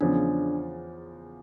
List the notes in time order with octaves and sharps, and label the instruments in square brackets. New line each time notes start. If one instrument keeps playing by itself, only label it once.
[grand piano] E2 C#3 F3 [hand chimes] D4